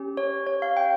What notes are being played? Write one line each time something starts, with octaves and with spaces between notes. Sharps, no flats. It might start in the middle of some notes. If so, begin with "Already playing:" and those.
Already playing: C#4 G4
C#5
C#5
F5
G5